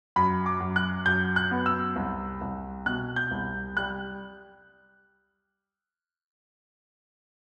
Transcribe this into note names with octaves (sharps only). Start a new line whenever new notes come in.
F#2 B5
D6
F#2
F#6
F#2 G6
F#6
B3
E6
C2
C2
B2 F#6
G6
C2
G3 F#6